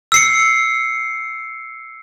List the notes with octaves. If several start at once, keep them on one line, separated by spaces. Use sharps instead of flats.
E6 C7 C#7